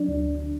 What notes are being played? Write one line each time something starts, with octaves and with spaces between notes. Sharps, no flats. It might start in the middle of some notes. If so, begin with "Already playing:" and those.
Already playing: F#3 D4
D2